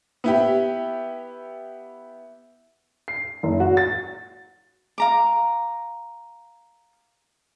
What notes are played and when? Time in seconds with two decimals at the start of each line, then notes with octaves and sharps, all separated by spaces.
0.24 B3 E4 G4
3.08 C7
3.43 F#1
3.60 F#4
3.77 A6
4.98 F5 A#5 D6